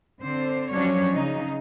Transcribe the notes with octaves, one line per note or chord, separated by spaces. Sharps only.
D3 C4 C5
F3 F#3 C#4 D4 C#5
C#3 D#4